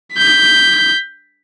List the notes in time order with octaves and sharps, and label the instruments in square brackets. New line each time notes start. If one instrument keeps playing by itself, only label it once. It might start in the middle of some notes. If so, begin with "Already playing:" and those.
[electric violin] G6 B6